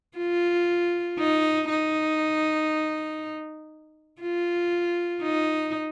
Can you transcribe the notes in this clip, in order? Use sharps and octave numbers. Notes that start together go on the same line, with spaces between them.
F4
D#4
D#4
F4
D#4